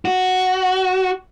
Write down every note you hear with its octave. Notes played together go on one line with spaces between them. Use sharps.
F#4